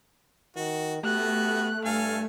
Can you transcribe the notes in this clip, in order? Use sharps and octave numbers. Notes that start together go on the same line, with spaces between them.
D#3 F#4
A3 B3 F#4 G4 F#6
G2 A4 F5 G#5